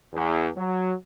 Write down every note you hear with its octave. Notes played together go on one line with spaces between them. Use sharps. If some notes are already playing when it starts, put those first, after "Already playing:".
E2
F#3